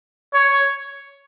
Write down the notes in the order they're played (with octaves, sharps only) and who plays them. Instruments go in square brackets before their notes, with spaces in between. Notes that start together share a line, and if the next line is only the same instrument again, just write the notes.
[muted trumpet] C#5